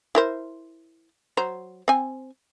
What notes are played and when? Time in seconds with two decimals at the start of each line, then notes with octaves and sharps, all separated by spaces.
0.15 E4 A#4 C5
1.37 F#3 C5 A#5
1.88 C4 G#5